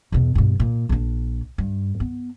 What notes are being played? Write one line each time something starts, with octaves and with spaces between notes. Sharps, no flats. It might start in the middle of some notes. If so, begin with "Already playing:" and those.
E2 B2
G2 B2
A#2
A#1 D4
G2
B3